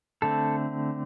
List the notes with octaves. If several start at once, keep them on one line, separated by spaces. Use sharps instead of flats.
D3 A3 C4 A4